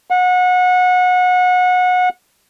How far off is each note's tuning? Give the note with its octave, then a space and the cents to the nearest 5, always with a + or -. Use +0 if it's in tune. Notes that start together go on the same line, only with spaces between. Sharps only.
F#5 -25